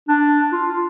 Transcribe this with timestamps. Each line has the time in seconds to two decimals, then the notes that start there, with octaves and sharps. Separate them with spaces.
0.08 D4
0.53 F4
0.68 F4